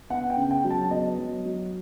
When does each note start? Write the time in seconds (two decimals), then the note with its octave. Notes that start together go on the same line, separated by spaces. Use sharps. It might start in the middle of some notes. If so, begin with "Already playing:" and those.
0.10 B3 F#5
0.30 G5
0.37 C#3
0.51 G5
0.64 F#3
0.70 A5
0.90 B3 D#5
1.18 F#3
1.45 F#3